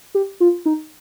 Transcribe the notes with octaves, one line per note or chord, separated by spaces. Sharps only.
G4
F4
D#4